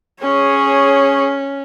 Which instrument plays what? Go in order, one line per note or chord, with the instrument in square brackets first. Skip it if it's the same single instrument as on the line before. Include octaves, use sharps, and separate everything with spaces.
[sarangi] C#4 [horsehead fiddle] G#4 C#5